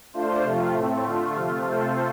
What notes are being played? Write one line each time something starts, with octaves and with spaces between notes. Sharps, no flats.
A3 D4 F4 C5
C3 F3 A3 F4
A2 A3 C4
D3 A3 F4
C3 F3 A3 F4
C3 A3 F4 A4 C5